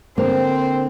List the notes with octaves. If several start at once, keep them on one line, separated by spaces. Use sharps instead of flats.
D3 A#3 C4 C5